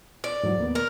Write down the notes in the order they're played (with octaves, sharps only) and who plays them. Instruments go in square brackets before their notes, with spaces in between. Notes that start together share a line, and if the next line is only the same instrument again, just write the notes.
[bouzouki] D5
[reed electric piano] G#2 E3 F#3
D#2 A#3 B3
[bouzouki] A#4